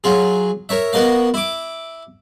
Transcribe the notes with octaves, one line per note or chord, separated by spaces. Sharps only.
F#3 F4 G#4
A#4 C#5 E5
B3 F#4 A#4 D#5 F5
E4 D6